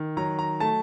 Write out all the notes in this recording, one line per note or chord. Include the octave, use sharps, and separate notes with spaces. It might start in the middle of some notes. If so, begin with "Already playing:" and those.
Already playing: D#3
F#3 A#5
A#5
A3 A5